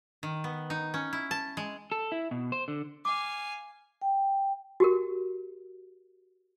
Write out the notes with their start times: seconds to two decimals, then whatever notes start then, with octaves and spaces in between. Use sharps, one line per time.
0.23 D#3
0.44 B3
0.70 D#4
0.94 C#4
1.13 E4
1.31 A5
1.57 G#3
1.92 A4
2.12 E4
2.31 B2
2.52 C5
2.68 D3
3.05 F5 G#5 D6
4.02 G5
4.80 F#4 G4 A#4